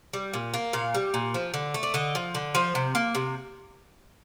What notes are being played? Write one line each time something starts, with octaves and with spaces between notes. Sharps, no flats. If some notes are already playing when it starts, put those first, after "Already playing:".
G3
A#2
A#3
A#2 F5
G3
A#2
F3
D3
A3
D5
D3 D#5
F3
D3
F3 C5
C3
A#3
C3